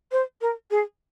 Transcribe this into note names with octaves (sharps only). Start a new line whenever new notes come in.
C5
A#4
G#4